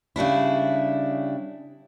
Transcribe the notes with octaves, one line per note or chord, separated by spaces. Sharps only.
C#3 G3 D4 E4